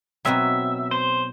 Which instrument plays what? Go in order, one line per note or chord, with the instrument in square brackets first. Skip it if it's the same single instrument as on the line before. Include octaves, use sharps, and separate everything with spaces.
[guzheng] B2 F#3 C4 D#4 F#4 [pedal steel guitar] E5
[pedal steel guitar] C5